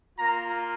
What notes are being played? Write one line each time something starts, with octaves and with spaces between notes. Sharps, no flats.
A#3 F4 A#5